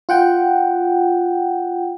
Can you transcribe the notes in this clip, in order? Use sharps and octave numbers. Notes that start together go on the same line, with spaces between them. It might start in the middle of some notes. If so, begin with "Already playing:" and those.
F4 F#5 G5